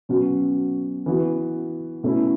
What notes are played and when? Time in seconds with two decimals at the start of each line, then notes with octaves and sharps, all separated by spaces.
0.09 B2 F#3 C#4 F#4
1.06 E3 B3 F#4
2.03 B2 A3 C#4 E4